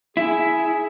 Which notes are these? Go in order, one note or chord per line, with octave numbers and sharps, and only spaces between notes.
E4 G#4